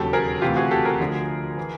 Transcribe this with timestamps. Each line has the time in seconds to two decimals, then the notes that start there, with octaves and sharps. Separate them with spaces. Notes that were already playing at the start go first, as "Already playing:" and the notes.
Already playing: E1 D#2 C#3 F#3 G4 A4
0.13 G#4 A#4
0.42 D2 C3 E3 F4 G4
0.56 F#4 G#4
0.71 G4 A4
0.85 G#4 A#4
1.00 D2 D3 F3
1.57 E3